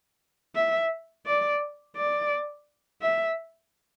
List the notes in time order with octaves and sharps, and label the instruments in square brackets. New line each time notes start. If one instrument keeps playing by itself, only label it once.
[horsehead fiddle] E5
D5
D5
E5